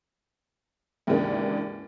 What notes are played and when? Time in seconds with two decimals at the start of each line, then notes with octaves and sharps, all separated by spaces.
1.07 D#2 G#2 C#3 E3 A#3 D4